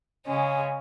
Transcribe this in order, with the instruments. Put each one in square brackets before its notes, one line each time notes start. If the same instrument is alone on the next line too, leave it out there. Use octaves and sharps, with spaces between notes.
[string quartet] C#3 G#3 C#4